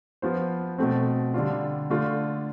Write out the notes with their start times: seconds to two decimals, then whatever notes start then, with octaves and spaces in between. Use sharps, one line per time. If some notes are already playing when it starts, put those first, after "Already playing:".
0.22 F3 B3 F4 C5
0.78 B2 A3 C4
1.34 D3 G3 D4 F4
1.90 D3 A3 D4 F4